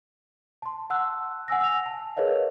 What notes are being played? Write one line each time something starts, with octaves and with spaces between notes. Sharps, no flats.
A5 C6
F#5 A5 E6 F#6
F#5 G#5 E6 A#6
E6 F7
A5
G#4 A#4 B4 C#5 D#5 F5